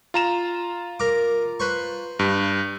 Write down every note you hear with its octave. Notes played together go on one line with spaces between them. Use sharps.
F4 A#5 E7
A#4 D6
B4 C5 C#6
G2